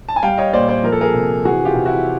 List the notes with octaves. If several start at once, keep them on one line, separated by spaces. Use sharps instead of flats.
A5
G#5
G3 F5 G5
C#5 D#5
A#2 C5 D5
C5 D5
F3 A#4
A4
G#4 A#4
C3
E3 F#4 G#4
F4 G4
C3
E4 F#4